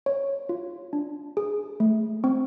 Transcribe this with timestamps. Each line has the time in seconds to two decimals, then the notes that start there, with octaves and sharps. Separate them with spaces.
0.06 C#5
0.49 F4
0.93 D4
1.37 G#4
1.80 A3
2.24 C4